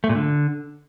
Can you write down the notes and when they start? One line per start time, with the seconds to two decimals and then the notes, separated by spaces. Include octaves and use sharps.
0.04 A3
0.09 A#2
0.15 D3